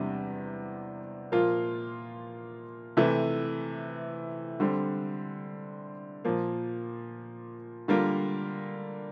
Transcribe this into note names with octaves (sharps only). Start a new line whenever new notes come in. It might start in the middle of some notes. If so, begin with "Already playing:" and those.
Already playing: E2 C3 G3 D4
A#2 F3 A#3 F4
C3 E3 A3 E4
D3 G3 C4
A#2 F3 A#3
D3 G3 A#3 F4 A#4